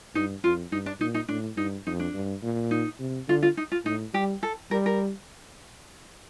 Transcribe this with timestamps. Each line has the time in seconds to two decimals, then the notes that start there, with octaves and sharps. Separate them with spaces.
0.15 G2 D#4
0.44 F2 F4
0.72 G2 D#4
0.86 D4
1.00 A#2 D#4
1.14 D#4
1.28 A2 D4
1.57 G2 D#4
1.86 F2 D#4
2.00 D4
2.14 G2
2.43 A#2
2.71 D#4
3.00 C3
3.28 D3 F4
3.43 F4
3.57 D#4
3.72 F4
3.85 A2 D#4
4.14 G3 G4
4.43 A4
4.71 G3 A#4
4.86 A#4